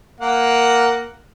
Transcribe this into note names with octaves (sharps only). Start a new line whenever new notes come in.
A#3 F#5